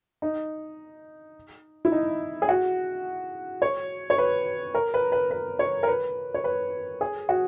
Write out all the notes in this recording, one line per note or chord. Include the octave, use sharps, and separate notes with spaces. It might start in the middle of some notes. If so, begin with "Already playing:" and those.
D#4
E4
D#4
G#4
F#4
C#5
C#5
B4
A#4
B4
B4
B4
C#5
A#4
B4
C#5
B4
G#4
F#4